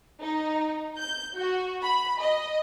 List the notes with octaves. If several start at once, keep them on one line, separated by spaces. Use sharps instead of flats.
D#4
G6
F#4
B5
D#5